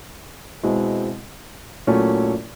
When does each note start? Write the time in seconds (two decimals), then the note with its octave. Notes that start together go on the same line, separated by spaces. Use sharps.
0.63 B2 G#3 C4 E4
1.87 A#2 F#3 A3 C#4 E4